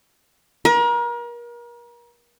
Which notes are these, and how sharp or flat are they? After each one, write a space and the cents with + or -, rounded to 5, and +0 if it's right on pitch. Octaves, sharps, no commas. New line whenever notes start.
A#4 +35